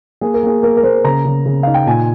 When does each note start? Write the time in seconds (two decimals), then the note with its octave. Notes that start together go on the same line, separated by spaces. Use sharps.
0.21 A#3 G#4
0.34 A#4
0.43 A#3 G#4
0.63 A#3 A#4
0.77 A#4
0.83 A#3 C5
1.04 C#3 A#5
1.25 C#3
1.46 C#3
1.63 D#4 F5
1.74 G5
1.87 A#2 G#5